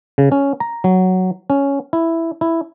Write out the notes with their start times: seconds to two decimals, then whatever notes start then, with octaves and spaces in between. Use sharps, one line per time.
0.18 C#3
0.32 C#4
0.60 A#5
0.84 F#3
1.50 C#4
1.93 E4
2.41 E4